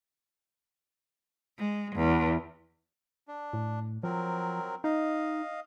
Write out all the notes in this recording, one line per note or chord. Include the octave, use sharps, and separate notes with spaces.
G#3
E2
D4
A2
F3 F#3 C4 A#4
D#4 D#5 F5